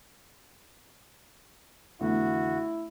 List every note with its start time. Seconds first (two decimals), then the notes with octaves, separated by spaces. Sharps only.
2.01 F2 D3 E3 A3 B3 D4 E4 F#4